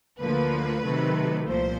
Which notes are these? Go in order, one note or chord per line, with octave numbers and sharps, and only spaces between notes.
D2 D3 F3 A#3 B4
C3 D#3 F#3 A3
C2 A#2 F3 C5